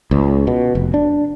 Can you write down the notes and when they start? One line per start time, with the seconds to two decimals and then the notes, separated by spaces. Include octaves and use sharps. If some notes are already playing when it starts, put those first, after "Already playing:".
0.11 C#2
0.47 B2
0.75 F1
0.94 D4